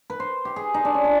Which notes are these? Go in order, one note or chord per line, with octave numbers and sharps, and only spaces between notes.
B4
C5
G4
G#4
D#4
D4
C#4
D4